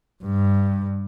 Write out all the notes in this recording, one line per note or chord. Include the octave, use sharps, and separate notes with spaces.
G2